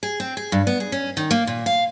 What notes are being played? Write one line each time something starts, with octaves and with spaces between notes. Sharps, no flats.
G#4
C4
G#4
G2
B3
G#4
C#4
D#3
A#3
A#2
F5